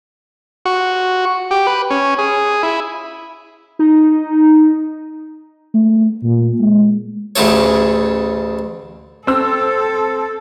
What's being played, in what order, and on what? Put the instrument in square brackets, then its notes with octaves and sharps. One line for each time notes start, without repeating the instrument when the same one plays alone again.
[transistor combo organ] F#4
G4
B4
C#4
G#4
E4
[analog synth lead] D#4
[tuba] A3
A#2
G#3
[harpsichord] A1 D2 C#3 A3 A4 C#5
[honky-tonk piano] C4 E6 [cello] A4